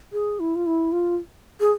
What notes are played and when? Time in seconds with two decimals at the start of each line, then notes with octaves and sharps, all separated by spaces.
0.13 G#4
0.40 E4
0.56 F4
0.66 E4
0.92 F4
1.60 G#4